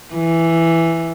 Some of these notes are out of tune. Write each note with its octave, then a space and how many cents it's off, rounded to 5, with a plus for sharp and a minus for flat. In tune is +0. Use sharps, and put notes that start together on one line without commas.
E3 +5